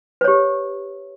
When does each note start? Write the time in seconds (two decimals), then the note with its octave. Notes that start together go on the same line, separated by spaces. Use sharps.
0.21 B4
0.24 C#5
0.28 G4